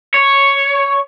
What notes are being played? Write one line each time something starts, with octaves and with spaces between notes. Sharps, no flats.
C#5